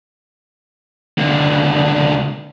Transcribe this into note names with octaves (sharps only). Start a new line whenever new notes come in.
C#2 D3